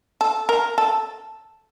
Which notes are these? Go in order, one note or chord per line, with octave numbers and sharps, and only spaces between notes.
A4
A#4
A4